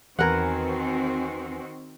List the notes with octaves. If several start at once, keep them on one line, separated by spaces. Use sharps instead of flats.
E2 D#3 C4 F#4 A#4 B4 F#5 G#5